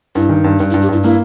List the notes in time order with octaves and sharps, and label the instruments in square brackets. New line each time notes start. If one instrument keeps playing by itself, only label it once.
[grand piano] G2 [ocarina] E4
[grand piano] D#3
G2
[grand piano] G2 [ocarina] D#4
[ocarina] E4
[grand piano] G2
[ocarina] G4
[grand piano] G2 [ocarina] E4
[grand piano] A#3 [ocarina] E4